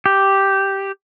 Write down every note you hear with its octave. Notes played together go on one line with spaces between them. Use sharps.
G4